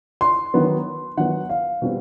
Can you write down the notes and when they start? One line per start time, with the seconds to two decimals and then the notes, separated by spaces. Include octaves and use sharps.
0.21 C6
0.54 D#3 F#3 B3
1.17 D#3 F#3 B3 F#5
1.49 F5
1.82 B2 G3 C4